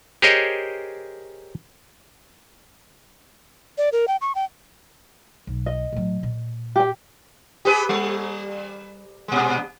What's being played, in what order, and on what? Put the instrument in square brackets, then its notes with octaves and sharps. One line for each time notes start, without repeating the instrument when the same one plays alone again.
[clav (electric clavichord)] G4 G#4 A#4 C5 C#5 D#5
[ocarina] D5
A#4
G5
C#6
G5
[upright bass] B1
[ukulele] D#5
[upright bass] A2 F#3
A#2
[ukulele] G4 G5
[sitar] G4 G#4 B4
G3
A#2 G#3